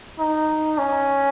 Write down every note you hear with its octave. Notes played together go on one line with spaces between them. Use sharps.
D#4
C#4